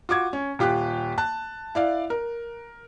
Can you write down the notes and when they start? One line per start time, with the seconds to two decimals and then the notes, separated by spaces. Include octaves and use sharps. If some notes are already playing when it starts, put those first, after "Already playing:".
0.09 F4 F#4 D6 G#6
0.33 C#4
0.59 D#1 F4 G4 D6 F#6
1.18 A5 F#6
1.75 E4 D5 F5
2.10 A#4